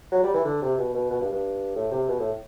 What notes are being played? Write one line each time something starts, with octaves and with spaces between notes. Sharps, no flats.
F#3
G3
E3
D3
C3
B2
B2
B2
G2
G2
A2
C3
B2
A2